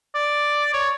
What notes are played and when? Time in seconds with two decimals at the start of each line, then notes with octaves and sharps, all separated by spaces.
0.15 D5
0.74 C#5